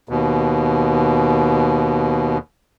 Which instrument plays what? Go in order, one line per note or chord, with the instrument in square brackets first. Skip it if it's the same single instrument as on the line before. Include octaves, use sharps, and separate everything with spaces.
[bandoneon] D#2 B2